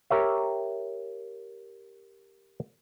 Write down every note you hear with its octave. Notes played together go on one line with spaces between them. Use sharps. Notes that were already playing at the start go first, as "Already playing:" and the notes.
G4 A#4 C#5 E5